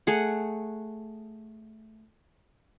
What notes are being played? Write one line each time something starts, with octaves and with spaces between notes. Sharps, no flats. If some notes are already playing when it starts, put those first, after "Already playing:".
A3 G#4 F#5